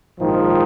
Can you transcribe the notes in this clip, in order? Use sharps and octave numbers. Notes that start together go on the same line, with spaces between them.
A#1 G#2 D#3 F3